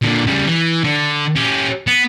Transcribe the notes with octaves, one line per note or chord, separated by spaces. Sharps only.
A#2 D3
C#3 G3
E3
D3
C#4 G4
B3